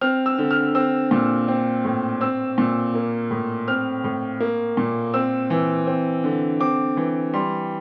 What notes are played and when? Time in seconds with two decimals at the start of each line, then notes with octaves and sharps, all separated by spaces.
0.01 C4 F6
0.26 E6
0.38 D3
0.51 F6
0.75 C4 E6
1.11 A#2
1.48 C4
1.85 A2
2.21 C4 E6
2.58 A#2
2.95 A#3
3.31 A2
3.68 C4 F6
4.04 A2
4.40 A#3
4.77 A#2
5.14 C4 E6
5.50 E3
5.87 C4
6.24 D3
6.60 C4 D6
6.97 E3
7.33 G3 C6